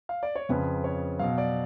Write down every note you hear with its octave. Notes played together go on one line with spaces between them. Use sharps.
F5
D5
C#5
F2 C#3 F3 B4
C#5
B2 F#3 F5
D5